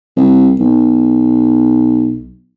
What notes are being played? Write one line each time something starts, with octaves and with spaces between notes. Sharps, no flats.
C2
B1